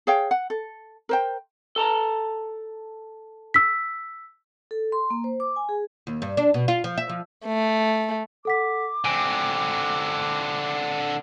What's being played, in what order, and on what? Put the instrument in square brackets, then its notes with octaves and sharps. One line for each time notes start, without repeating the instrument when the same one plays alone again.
[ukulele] G#4 C#5 F5 G5
F#5
A4
A#4 C5 G5
[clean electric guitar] A4 A5 A#5
[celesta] E6 B6
[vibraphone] A4
C6
A#3
C5
D6
G#5
G#4
[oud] D#2
G2
D4
B2
F4
F3
E5
F3
[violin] A3
[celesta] A4 F#5 B6 [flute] D6
[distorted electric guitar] D3 C4 [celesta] G#5 D7 D#7